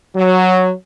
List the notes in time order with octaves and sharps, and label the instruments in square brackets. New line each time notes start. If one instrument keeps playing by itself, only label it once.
[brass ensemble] F#3